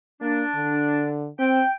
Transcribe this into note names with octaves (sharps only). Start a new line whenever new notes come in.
A#3 D4
D3
C4 G5